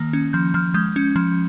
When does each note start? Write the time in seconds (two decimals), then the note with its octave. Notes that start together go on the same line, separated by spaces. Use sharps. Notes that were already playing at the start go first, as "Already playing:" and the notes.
Already playing: D#3 A#3
0.13 C#4
0.33 F3 G6
0.54 F3 F6
0.74 G#3 G6
0.96 C#4
1.16 F3